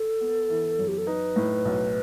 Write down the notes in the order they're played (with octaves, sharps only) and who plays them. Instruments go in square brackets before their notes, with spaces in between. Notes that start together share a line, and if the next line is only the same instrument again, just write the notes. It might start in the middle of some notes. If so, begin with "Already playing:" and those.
Already playing: [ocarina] A4
[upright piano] B3
E3
F#2
[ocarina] G4
A4
[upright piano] D#4 [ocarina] B4
[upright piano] A2
B1